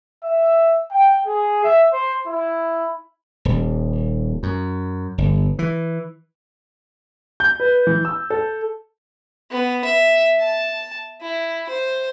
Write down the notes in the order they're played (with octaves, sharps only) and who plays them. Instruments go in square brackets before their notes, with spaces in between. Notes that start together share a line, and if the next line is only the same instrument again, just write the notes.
[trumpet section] E5
G5
G#4
E5
C5
E4
[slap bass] D#1
F#2
G1
E3
[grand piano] G6
B4
E3
E6
A4
[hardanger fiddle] B3
E5
A5
E4
C5